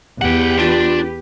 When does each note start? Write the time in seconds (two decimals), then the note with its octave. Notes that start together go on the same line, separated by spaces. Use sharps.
0.21 E2 G4 B4 F#5 G5
0.59 D4 F4